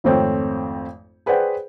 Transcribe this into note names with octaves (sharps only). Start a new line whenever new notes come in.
G#1 F2 A3 C4 C#5 G5
G#4 B4 C5 D5 F#5 G5